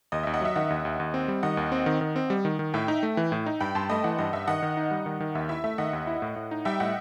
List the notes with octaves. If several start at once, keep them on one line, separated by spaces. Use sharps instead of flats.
D#2 D#5
D#2 E5
D#5 F#5
F#3 E5
D#3 D#5 F#5
D#2
D#2
D#2
C4
G3
D#3 D#5 F#5
D#2
C4
D#3
D#3
C4
G3
D#3
D#3
A2 E5 G5
D#4
A3
E3
A2
D#4
G2 G5 B5
G2 A5 C6
A3 D#5
E3 D#5 F#5
G2 D#5
G2 E5
D#3 D#5 F#5
D#3
D#4
G3
D#3
D#3
D#2 E5
E4 E5
A3 E5
D#3 D#5 F#5
D#2
E4
A2
A2
D#4
G3 E5 G5
A2 D#5 F#5